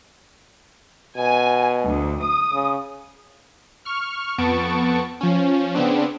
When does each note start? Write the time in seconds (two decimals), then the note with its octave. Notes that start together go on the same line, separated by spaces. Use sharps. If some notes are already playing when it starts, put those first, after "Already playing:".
1.17 B2 G#5
1.82 D2
2.21 D#6
2.53 C#3
3.85 C#6 F6
4.38 F2 B3 A5 C#6 D7
5.21 F3 C#4
5.75 C#3 B3 C4 D4